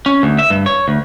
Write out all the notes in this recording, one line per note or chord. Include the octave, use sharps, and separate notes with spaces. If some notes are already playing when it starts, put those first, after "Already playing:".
C#4
D2
E5
G2
C#5
D2